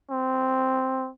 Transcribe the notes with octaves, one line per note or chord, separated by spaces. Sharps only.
C4